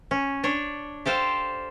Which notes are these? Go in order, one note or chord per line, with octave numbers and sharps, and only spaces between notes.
C#4
D4 C#5
G4 A4 C5 F5 G5